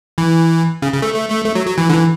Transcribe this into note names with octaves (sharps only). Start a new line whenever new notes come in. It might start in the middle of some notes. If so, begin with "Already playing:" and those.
E3
C#3
C#3
A3
A3
A3
A3
F#3
F#3
E3
D3
E3